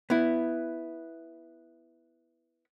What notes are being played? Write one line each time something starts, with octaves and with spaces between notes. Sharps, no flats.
B3 E4